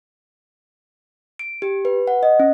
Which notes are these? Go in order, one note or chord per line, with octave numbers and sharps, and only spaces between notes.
D7
G4
B4
F#5
D#5
C#4